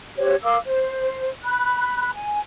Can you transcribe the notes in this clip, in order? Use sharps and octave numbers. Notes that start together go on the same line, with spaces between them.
G4 C5 C#5
A#4 F5 D6 E6
C5
B5 F#6
G#5